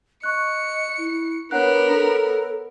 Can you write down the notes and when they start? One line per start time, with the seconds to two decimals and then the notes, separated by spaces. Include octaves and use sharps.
0.23 D#5 C#6 F#6 C#7
0.98 E4
1.51 B3 D4 A#4 C#5 F#5 F#6
1.92 A4